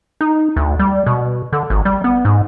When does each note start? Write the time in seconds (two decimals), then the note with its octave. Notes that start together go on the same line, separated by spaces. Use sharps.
0.21 D#4
0.56 D2
0.79 G3
1.06 B2
1.53 D3
1.70 G#1
1.85 G3
2.04 B3
2.25 G#2